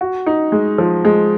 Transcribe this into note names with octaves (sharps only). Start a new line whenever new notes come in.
F#4
D#4
G#3
F3
G#3